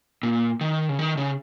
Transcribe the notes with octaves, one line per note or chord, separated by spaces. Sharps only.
A#2
D#3
C#3
D#3
C#3